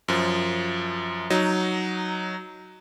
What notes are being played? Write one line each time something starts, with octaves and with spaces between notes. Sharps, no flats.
F#2 F3
F#3 D#4